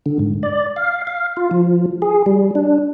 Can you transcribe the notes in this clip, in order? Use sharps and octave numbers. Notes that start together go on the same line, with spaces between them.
D3
G#2
D5
F5
F5
F4
F3
G#4
G3
D4